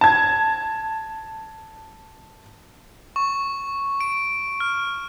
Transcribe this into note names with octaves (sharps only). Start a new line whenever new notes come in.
A5 G#6
C#6
D7
F6